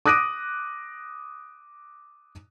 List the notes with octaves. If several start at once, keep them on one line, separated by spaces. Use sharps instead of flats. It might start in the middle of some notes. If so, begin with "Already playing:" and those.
D6 D#6 F#6 A#6 D7 D#7